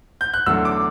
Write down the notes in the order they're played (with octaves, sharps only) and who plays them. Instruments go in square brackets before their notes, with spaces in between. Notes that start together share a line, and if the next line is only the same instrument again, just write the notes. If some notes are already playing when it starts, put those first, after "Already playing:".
[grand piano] G6
F#6
E2 D3 F#3 A3 E6
D6